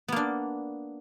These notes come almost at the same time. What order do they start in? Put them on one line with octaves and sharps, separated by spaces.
B3 A#3 D4